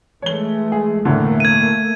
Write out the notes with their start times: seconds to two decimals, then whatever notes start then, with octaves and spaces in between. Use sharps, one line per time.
0.22 E3 G#3 A3 C#5 G7
0.72 G#4
1.05 E1 A2 D3 A3 A#3
1.40 G#6 D#7